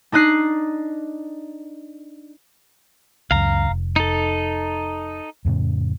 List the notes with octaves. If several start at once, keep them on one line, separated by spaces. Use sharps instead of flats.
D4 D#4 D#6 F#6 C7
C#2 F#2 F5 A#5
F1
D#4 A4
F2 A2 C#3